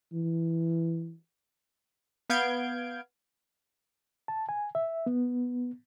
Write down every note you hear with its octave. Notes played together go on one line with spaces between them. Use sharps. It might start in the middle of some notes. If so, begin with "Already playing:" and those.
E3
B3 F5 G6 G#6 D7
A5
G#5
E5
B3